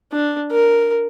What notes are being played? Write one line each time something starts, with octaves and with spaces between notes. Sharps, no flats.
D4
A#4